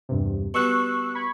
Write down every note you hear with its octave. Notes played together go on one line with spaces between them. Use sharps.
E2 G2 C3
B2 G3 C#6 E6 F#6
B5 C#6 G#6